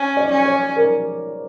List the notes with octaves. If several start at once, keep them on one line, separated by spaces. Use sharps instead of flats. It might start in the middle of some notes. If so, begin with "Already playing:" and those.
Already playing: C#4
D5
C#4
C#5
A#4